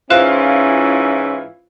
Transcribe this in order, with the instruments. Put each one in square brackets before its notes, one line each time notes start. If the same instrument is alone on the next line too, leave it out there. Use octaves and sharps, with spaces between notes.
[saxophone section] G#2 E3 E4 [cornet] C#4 [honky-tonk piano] F4 [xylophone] C5 F#6 E7